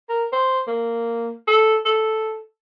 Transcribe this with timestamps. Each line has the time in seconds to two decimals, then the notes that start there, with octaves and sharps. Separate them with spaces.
0.09 A#4
0.33 C5
0.67 A#3
1.48 A4
1.85 A4